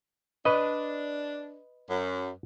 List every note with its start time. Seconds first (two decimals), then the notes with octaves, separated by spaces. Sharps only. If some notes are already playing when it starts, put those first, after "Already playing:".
0.45 D4 B4 D#5
1.89 F#2